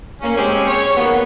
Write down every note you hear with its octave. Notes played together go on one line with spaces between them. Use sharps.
A#3 C#4
G#3 C4 C#4 G4 G#4
C#5
D#2 A#3 B3